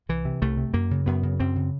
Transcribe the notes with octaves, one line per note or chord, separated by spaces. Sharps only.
C2 E3
C3
C2 A3
C3
F#2 A#3
C#3
F#2 B3
C#3
F#2 C4
C#3